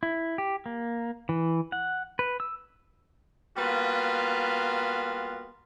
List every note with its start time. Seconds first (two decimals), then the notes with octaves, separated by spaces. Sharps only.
0.03 E4
0.38 G4
0.66 A#3
1.29 E3
1.72 F#5
2.19 B4
2.40 E6
3.56 G3 A#3 B3 F4 F#4